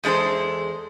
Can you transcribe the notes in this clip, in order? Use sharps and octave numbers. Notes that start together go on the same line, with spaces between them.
E2 G#3 D4 A4 C5